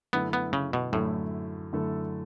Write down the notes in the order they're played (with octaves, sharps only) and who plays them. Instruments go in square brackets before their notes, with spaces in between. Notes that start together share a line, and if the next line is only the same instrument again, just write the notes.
[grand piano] F#2 D3 A3 E4 A4 [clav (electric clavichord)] B3
[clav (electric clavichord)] B3
C#3
B2
[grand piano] F#2 D3 A3 E4 A4 [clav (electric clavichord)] A2
[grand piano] F#2 D3 A3 E4 A4